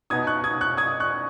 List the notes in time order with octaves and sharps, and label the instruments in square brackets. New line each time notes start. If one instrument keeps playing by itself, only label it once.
[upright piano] B2 B3 D#4 D#6 G#6
C#6 F#6
D#6 G#6
C#6 F#6
D#6 G#6
C#6 F#6